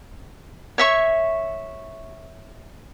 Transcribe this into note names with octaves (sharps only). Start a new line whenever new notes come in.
C#5 E5 C#6